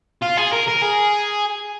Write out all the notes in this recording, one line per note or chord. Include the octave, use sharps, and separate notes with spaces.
F4
G#4
A#4
A#4
G#4